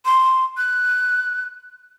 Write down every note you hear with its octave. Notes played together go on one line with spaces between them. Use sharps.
C6
F#6